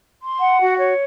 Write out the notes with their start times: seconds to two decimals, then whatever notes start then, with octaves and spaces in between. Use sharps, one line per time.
0.22 C6
0.40 F#5
0.59 F#4
0.79 C#5